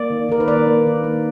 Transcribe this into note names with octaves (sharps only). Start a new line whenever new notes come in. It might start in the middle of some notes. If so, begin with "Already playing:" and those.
Already playing: A#3 D5
D#3
D#3 A#4
B4
A#3 D5
A#3
D#3
A#3